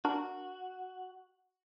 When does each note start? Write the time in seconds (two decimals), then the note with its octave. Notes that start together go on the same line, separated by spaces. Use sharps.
0.05 D4 F#4 A#4